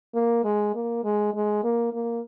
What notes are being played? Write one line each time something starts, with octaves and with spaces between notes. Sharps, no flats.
A#3
G#3
A#3
G#3
G#3
A#3
A#3